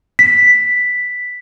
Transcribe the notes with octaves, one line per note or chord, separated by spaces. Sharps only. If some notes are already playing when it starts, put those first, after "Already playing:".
B6